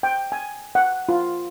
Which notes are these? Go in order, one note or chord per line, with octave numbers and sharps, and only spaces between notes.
G5
G#5
F#5
F4